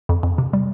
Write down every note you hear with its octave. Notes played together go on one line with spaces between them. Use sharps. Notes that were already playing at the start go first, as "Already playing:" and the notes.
F2
F2
C3
G3